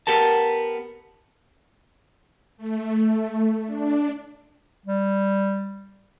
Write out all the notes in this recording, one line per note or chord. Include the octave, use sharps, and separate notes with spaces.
B3 G4 A#4 A5
A3
D4
G3